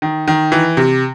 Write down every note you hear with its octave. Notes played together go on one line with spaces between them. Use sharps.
D#3
D#3
E3
C3